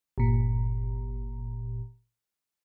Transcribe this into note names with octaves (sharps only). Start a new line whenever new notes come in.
G1 A#2